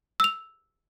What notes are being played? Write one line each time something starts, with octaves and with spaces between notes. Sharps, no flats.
E6 F7